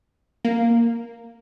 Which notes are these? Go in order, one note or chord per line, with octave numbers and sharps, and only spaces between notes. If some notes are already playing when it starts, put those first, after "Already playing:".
A#3